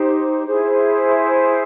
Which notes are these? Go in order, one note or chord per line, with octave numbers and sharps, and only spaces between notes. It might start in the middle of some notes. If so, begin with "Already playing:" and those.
Already playing: D#4 G4 C5
E4 G#4 C5